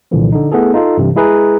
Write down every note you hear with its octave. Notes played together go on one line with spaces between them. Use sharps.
C2 A#2 D3 E3 F3
D3 D#4
A3 B3 E4 G#4 A4
D#4 F4 A4
G2 C3 E3
G#3 E4 G#4 B4 A#5